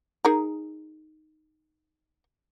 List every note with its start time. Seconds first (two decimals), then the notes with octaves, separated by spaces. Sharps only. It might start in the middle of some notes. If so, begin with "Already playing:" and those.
0.25 D#4 G#4 A#4